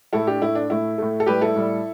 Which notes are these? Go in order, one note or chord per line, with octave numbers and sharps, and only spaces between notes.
A2 A3 E4 A4
D4 G4
A2 A3 E4
D4
A2 A3 E4
A2 A3
A4
A2 G3 G4 B4
E4 A4
A2 G3